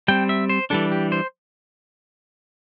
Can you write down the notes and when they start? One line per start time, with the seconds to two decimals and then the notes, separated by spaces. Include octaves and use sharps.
0.08 G3 C4 G5
0.29 E5
0.49 C5
0.70 E3 G3 D4 A4
0.92 G4
1.12 C5